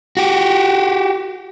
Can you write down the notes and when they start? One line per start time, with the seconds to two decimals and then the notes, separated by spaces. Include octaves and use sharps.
0.17 F#4 G4